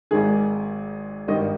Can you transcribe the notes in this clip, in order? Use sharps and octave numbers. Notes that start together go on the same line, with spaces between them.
G#1 G#2 D#3 G#4
G#1 G2 D#3 D#5